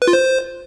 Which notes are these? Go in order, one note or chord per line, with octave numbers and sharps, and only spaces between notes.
B4
F4
C5